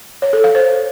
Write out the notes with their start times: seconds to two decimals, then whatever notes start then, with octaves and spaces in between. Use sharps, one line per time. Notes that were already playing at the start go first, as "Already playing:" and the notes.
0.22 C#5
0.33 A4
0.44 F5
0.55 C5